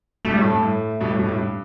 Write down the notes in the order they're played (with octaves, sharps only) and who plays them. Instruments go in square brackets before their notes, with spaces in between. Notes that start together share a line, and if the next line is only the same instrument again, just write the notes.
[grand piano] G2 B2 [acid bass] A3
[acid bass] G3
[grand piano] A2 [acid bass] A3
[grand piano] G2
A2
G2 B2
A2
G2 B2
A2
G2